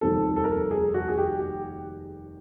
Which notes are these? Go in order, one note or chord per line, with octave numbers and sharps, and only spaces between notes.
F1 D#2 D#3 G3 C4 A4
A4
A#4
A4
G#4
F#4
G#4
G4
G4